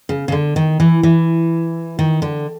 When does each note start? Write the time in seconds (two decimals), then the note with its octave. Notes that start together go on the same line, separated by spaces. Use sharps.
0.09 C#3
0.28 C#3
0.32 D3
0.56 D#3
0.80 E3
1.03 E3
1.99 D#3
2.22 D3